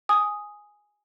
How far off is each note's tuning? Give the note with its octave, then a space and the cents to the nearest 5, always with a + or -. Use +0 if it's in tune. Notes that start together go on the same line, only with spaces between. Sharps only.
G#5 +0 D#6 +0